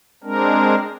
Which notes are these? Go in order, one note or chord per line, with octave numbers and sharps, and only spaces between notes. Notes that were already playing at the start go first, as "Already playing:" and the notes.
G#3 C4 D4 A#4